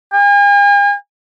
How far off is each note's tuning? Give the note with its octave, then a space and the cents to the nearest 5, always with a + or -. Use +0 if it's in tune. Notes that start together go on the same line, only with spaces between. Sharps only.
G#5 -45